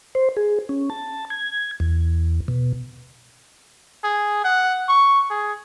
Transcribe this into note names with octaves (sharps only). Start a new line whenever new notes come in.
C5
G#4
C#4
A5
G#6
E2
B2
G#4
F#5
C#6
G#4